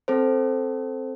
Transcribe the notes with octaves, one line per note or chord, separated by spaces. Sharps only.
C4 A4 C5